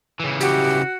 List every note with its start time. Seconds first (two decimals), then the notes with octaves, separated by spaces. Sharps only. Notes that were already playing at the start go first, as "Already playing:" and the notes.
0.20 C#3 E3
0.40 F#4 G4